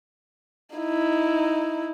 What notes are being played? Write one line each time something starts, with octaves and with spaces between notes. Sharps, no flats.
D#4 E4